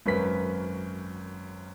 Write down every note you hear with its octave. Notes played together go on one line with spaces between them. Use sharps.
G#1 F#2 A#4 B4 B6